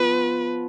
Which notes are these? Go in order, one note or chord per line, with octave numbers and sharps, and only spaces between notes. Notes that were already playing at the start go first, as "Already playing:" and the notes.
Already playing: F3 B3 F4 B4